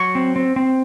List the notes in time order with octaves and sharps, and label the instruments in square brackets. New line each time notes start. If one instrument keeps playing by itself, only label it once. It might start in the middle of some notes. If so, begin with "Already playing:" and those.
Already playing: [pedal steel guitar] F#3 C#6
C4
C4
C4